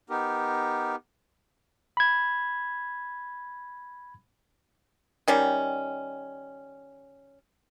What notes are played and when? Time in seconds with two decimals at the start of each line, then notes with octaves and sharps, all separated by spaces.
0.10 B3 D#4 G4 A#4
1.97 B5 G#6
5.28 D#3 G3 C#4